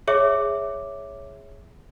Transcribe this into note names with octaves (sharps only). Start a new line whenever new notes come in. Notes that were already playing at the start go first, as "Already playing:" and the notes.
G#4 C#5 E5 D6